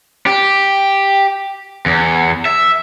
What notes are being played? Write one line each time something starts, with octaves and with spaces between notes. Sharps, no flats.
G4
E2
E5